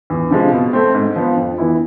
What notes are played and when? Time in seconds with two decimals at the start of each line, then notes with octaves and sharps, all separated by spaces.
0.10 E2
0.31 C3 F3 G#3
0.52 B2
0.73 A3 C4
0.95 G#2
1.16 F3 B3
1.37 F2
1.58 E3 B3 E4